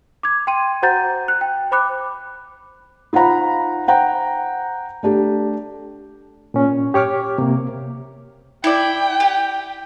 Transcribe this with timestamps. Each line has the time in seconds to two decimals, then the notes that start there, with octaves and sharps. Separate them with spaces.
0.23 D6 G#6
0.47 G5 C6 D#7
0.82 F#4 C5 F#5 A#5 G6 A6
1.28 F#6
1.41 G5
1.72 C5 B5 D6 F#6
3.13 D#4 F4 C5 F#5 A#5 B5
3.88 C5 F#5 G5 A#5
5.03 A3 D4 G4
6.54 A#2 C#4
6.94 G4 C#5 D6 F6
7.38 C3 A#3
8.64 E4 D5 G5
9.20 G4